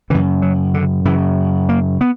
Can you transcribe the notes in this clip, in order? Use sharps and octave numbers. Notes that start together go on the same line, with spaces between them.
F#2 C#3 E3
F#3
D3
F#2 C#3 E3
A#3
B3